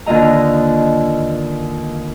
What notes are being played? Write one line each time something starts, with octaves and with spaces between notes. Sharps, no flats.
D#2 D3 F4 D#5 A#5